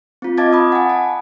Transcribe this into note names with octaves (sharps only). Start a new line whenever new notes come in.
C4 F4
D#5 F5 A5 D6 G#6 A6
B5 D#6
F#5 G#5
A5